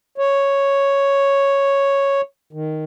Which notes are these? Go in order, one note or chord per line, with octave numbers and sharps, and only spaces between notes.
C#5
D#3